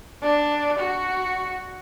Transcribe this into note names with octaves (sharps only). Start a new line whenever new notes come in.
D4
F#4